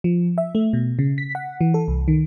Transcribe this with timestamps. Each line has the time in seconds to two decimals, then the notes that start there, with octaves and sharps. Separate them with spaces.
0.04 F3
0.38 E5
0.55 A3
0.73 B2
0.99 C#3
1.18 B6
1.35 F#5
1.61 E3
1.74 A4
1.88 C2
2.08 D#3